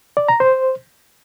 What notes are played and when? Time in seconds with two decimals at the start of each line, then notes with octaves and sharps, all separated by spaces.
0.17 D5
0.29 A#5
0.40 C5